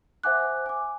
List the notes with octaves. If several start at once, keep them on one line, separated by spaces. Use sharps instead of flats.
C5 E5 F#5 G#5 D6 F#6
G#5 D6